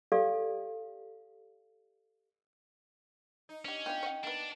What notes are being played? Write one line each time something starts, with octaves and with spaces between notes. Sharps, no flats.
G4 A4 D5 F5
D#4
C#4 D4 G4
B3 D4 F4 G5
C#5 F#5
A#3 B3 D4